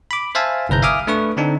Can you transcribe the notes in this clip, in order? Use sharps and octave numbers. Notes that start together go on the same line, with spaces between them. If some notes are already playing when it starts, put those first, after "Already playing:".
B5 D6
C5 E5 F5 G#5 A5
G1 C2 B4 A#5 G6
E5 F5 G#5 D6 D#6 F6
A3 D4 B4 C#6
D3 C4 D4 D#4